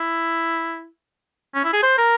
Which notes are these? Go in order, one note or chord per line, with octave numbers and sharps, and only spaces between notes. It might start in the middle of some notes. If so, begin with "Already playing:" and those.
Already playing: E4
C#4
E4
G#4
C5
A#4